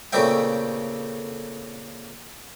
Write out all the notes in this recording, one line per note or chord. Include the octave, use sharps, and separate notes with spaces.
A#2 C#3 A3 C4 E5 G5